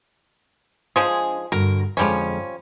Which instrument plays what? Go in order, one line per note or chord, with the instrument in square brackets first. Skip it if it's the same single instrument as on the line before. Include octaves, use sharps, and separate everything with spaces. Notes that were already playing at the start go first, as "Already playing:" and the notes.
[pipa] F3 G#3 G#4 [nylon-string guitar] D4 C5 D#5
[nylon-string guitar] G2 D3 F#4 [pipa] A#4
[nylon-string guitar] F2 D3 G#3 [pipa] F3 G3 C#4